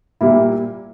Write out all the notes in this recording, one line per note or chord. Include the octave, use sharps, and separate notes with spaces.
A#2 G3 A#3 E4